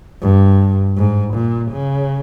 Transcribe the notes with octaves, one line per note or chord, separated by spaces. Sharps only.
G2
G#2
A#2
C#3